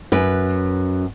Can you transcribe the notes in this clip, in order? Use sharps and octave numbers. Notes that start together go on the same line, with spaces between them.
F#2 B4